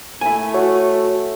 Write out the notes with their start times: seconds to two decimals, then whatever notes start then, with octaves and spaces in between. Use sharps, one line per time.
0.21 A3 E4 G#5
0.54 F#4 C#5